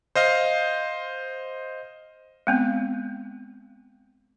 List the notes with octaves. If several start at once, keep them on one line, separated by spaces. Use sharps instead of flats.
C5 D#5 F5
G#3 B3 C4